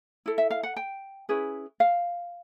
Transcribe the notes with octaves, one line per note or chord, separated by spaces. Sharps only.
E4 A4
E5
F5
F#5
G5
C#4 E4 G#4 B4
F5